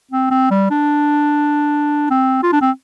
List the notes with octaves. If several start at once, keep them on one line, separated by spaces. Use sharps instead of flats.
C4
C4
G3
D4
C4
F4
D4
C4